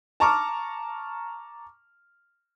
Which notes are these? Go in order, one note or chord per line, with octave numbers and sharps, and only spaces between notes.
A5 A#5 C#6 D6 F6